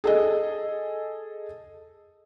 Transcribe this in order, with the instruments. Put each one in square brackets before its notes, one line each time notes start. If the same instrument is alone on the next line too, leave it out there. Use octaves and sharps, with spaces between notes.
[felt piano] G#4 A4 D#5